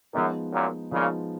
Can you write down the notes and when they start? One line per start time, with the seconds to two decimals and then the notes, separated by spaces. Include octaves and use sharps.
0.14 F#2 F3 G#3 B3 D#4
0.52 F#2 A#2
0.92 A#2 C#3 F3 G#3 B3 D#4